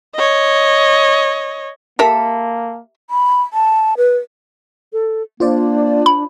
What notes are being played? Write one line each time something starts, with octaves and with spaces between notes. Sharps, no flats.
C#5 D#5
A#3 G4 A4 A#4 E5 B5
B5
A5
B4
A4
A#3 D4 F4 C5 D5
B5